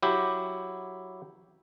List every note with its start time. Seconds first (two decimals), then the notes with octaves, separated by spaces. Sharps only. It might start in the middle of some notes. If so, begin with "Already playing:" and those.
0.03 F#3 E4 G4